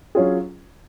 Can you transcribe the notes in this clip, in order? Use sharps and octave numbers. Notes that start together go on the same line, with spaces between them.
F#3 C#4 F4 G#4